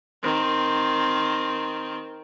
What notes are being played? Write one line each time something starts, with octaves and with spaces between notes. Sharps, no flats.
D#3 C4